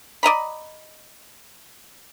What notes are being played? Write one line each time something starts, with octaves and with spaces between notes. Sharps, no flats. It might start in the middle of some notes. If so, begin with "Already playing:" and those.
D5 D#5 A#5 B5